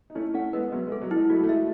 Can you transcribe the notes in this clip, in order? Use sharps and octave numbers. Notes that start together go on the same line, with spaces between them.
D#4
A3 C#4 E4
A3 C#4 F#5
G#3 B3 B4
F#3 B3
G#3
A4
F#3
G#3 E4
F#3 A3 F#4
A3
G#3 E5